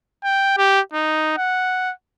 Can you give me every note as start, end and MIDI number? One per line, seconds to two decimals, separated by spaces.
0.24 0.55 79
0.57 0.80 67
0.93 1.34 63
1.38 1.92 78